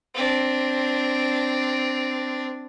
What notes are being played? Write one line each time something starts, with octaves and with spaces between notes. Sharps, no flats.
C4 D4